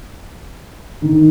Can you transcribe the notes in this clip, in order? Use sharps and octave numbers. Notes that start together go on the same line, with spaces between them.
D#3